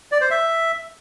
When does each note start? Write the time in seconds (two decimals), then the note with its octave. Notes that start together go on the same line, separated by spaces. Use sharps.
0.12 D5
0.21 C5
0.31 E5